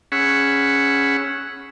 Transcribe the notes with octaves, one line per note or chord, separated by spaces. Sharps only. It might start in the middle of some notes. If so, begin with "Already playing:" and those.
C#4 G#4 F#5 B5 C#6 E6